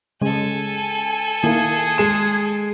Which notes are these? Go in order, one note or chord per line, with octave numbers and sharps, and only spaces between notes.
C#3 G#3 A4 G#5
D#3 A#3 E4 G#4
G#3 E7